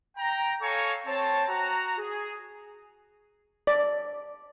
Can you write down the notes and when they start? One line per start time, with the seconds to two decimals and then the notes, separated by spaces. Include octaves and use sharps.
0.16 G5 A#5
0.62 A4 C#5 F5 G#5 A#5 C#6
1.06 C4 C#5 A5
1.48 F#4 A#5
1.97 G#4
3.67 D5